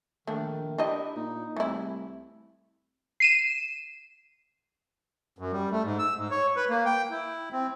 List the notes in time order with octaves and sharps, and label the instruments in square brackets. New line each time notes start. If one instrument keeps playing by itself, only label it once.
[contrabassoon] A#1 [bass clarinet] D#3 [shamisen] A3 D4
[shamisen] D4 G4 D#5 [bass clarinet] E4
[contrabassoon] A#2 [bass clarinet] D#4
[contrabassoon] C2 [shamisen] E3 E4 [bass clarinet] A3
[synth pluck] C7 D#7 E7
[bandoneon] F#2
G3
A3
G#2
E6
G#2
C#5
B4
A#3
G5
E4
C4